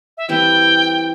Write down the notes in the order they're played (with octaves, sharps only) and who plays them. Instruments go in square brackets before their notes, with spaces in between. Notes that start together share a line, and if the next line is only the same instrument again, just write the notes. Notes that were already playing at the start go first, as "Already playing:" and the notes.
[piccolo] E5
[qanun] E3 G3 C4 E4 [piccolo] G5